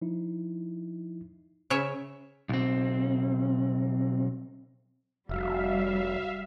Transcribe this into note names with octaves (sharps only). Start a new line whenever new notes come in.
F3 D#4 E4
C#3 C#5 E5
B1 C4
F1 G3 F#4 E5 F5